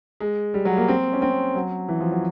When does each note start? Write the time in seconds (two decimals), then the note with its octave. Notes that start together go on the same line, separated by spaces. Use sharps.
0.20 G#3
0.54 G3
0.65 F#3
0.77 A#3
0.88 C4
1.13 C#4
1.22 C4
1.55 F#3
1.89 E3
2.00 F3
2.12 F#3